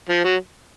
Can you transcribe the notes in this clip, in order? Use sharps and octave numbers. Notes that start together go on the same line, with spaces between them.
F3
F#3